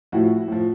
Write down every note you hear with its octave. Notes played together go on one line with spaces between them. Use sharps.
A2 F3 E4 F#4
A2 F3